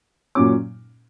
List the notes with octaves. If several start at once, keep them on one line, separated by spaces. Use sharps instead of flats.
A#2 F#3 C#4 D6